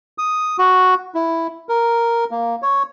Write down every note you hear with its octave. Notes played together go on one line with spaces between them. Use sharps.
D#6
F#4
E4
A#4
A#3
C#5